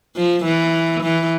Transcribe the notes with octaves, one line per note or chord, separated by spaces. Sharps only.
F3
E3
E3